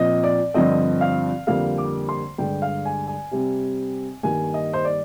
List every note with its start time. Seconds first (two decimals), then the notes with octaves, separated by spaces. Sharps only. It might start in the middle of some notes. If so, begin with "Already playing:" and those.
Already playing: A#2 F3 C4 D#5
0.24 D5
0.54 G2 D3 F3 C4 D#5
1.01 F5
1.47 F2 D3 G3 A#3 F5
1.78 D6
2.09 C6
2.38 G2 D3 G#3 G5
2.62 F5
2.85 G#5
3.08 G#5
3.31 C3 G3 C4
4.23 G2 D#3 G3 A#3 G#5
4.54 D#5
4.73 C5
4.85 D5